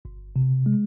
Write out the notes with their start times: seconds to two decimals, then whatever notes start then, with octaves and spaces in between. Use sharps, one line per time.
0.05 G1
0.36 C3
0.66 G#3